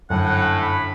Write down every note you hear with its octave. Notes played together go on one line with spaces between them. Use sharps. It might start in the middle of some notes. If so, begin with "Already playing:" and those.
G1 F#2 A2 F#5 G#5
B5